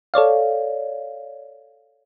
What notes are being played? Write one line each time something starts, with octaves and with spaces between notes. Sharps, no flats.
A4 C#5 D5 F5